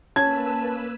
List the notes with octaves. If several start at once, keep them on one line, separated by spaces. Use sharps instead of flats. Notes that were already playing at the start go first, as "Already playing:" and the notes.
A#3 C#4 B4 A5 E6 G#6